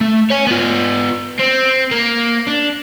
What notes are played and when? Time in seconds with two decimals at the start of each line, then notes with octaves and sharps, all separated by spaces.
0.01 A3
0.30 C#5 G#5
0.47 B3 F4
1.39 C4
1.91 A#3
2.48 D4